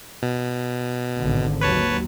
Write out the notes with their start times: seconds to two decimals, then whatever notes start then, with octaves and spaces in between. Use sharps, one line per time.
0.23 B2
1.18 G#1 D3
1.61 D#2 F#3 B4 C#5 A5